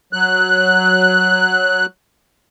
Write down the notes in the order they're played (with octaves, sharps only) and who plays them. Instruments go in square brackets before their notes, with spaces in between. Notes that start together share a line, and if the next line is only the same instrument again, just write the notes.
[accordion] F#3 F#6